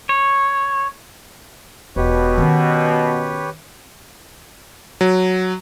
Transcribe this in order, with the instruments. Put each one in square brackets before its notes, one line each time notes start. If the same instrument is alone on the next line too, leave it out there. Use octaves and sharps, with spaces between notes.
[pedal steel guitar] C#5
[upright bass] E1 [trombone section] B2 [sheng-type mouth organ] G4 B4 C#5
[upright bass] D#3 C#4
[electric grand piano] F#3